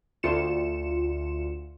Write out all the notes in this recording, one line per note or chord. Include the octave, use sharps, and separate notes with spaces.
D2 F4 C#7 E7